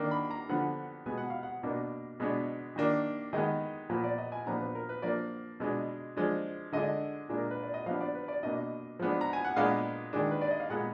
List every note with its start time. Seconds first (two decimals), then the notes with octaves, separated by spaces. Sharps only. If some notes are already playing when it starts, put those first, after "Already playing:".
Already playing: D#3 A#3 D4
0.11 B5
0.31 A#5
0.49 D3 F3 B3 F#5
1.06 B2 G#3 B3 G#5
1.18 F#5
1.30 F5
1.43 F#5
1.63 B2 A#3 D4
2.20 B2 G#3 B3 D4
2.76 D#3 A#3 D4
3.33 D#3 G#3 B3 D#5
3.90 A#2 F3 B3
4.04 D5
4.18 D#5
4.32 G#5
4.46 A#2 F3 B3 D4 A#5
4.61 B4
4.75 A#4
4.89 B4
5.02 F3 A#3 D4 D5
5.60 B2 G#3 D4
6.17 F3 G#3 D4
6.73 D3 G#3 D4 D#5
7.29 A#2 G#3 D4
7.38 A#4
7.51 B4
7.63 D5
7.74 D#5
7.86 F3 F5
7.89 B3 D4
8.01 D5
8.15 B4
8.28 D5
8.43 B2 A#3 D4 D#5
8.99 F3 G#3 B3 D4
9.21 A#5
9.33 G#5
9.45 F#5
9.56 A#2 G#3 B3 D4 F5
10.13 D#3 G#3 D4
10.31 B4
10.41 D5
10.51 D#5
10.60 F5
10.70 A#2 G#3 B3 F#5